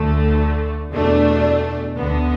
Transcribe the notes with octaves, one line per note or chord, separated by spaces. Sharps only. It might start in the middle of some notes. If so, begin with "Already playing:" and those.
Already playing: D2 D3 A3
E2 B2 A3 D4
D2 D3 B3